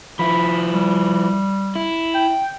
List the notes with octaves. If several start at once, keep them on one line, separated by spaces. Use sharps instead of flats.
F3 E4 B5
G3
E4
G5